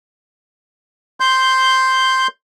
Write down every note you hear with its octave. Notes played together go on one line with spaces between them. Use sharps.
C6 G6